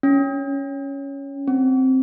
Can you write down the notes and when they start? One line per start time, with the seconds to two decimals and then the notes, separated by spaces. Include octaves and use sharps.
0.03 C#4
1.48 C4